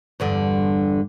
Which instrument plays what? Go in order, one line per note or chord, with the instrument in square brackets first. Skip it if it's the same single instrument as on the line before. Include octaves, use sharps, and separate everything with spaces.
[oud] E2 G2 D3